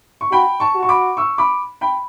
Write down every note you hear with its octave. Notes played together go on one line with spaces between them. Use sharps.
C#6
F#4 G5 B5
A5 C#6
F#4
C#6
B5 D6
C#6 E6
B5 D6
G5 B5